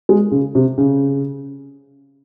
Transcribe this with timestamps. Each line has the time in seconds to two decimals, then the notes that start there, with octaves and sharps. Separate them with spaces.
0.09 G#3
0.31 C#3
0.55 C3
0.78 C#3